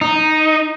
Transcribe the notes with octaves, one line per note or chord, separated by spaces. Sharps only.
D#4